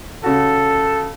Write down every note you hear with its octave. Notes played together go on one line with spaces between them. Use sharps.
C#3 F#4 A4